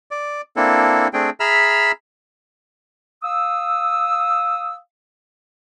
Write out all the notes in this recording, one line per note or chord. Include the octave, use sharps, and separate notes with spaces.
D5
A#3 C4 D4 E4 A4
A3 C4 D4 G#4 G5
G#4 E5 A#5 B5 E6 F6
F5 D#6 E6